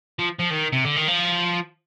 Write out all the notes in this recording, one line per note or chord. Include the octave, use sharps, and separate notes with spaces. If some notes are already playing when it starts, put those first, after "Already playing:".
F3
F3
D#3
C3
D3
D#3
F3